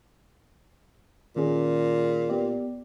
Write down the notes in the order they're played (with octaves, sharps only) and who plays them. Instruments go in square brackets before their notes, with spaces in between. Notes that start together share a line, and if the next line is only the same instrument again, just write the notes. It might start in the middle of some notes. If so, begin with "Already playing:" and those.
[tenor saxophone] A#2 [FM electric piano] D#3 C#4 G#4
[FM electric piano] B3 G4 D5